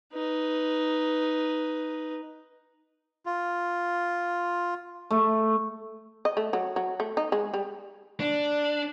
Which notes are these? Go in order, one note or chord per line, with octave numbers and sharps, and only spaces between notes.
D#4 B4
F4
A3
D#5
A3
F#3
F#3
A3
D#4
G#3
G3
D4